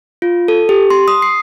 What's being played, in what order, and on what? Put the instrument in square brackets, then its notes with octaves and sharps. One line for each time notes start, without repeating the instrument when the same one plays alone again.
[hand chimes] F4
A4
G4
C6
D#6
C7